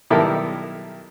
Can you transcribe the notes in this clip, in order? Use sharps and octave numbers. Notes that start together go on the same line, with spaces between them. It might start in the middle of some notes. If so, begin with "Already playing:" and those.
B1 D#3 G3 E4 A4 A#4